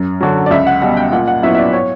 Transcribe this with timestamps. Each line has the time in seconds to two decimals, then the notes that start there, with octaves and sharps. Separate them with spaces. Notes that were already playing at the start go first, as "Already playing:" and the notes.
Already playing: F#2
0.21 D3 F#3
0.46 D5
0.51 C#2 E5
0.67 F#5
0.82 B2 G3 F#5
0.97 G5
1.12 A#2 F#5
1.28 F#5
1.43 F#3 B3 E4 E5
1.55 E5
1.59 D5
1.73 C#5